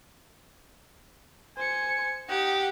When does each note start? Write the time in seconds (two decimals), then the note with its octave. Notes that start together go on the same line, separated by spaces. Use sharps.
1.57 C5 G#5 C#7
2.29 D#4 G4 F#5